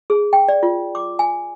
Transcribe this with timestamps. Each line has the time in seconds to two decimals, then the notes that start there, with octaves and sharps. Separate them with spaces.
0.10 G#4
0.33 G5
0.48 D5
0.63 F4
0.95 D6
1.19 G#5